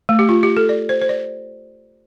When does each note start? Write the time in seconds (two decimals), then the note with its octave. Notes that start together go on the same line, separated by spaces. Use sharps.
0.09 A3
0.19 G4
0.29 F4
0.43 G4
0.57 A4
0.69 D5
0.89 C5
1.01 C5
1.09 D5